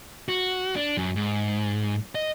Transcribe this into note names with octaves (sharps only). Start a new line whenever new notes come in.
F#4
D4
F#2
G#2
D#5